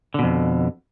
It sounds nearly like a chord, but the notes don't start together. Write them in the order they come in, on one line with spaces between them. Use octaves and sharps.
D3 B2 F2